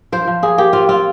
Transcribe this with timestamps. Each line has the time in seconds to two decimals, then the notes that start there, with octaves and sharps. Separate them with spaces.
0.12 F3 C5
0.27 F3
0.43 A#3 G#4
0.58 A#3 G4
0.73 C4 F4
0.88 C4 F4